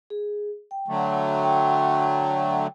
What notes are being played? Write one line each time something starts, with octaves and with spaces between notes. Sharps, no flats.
G#4
G5
D3 F#3 A3
G5